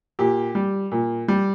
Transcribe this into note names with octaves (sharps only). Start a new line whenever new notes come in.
A#2 G4
G3
A#2
G3